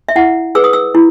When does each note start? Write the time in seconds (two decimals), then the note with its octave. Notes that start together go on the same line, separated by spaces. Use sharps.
0.09 E5
0.16 E4 F#5
0.55 G#4 B4 E6
0.64 D#6
0.73 E6
0.95 E4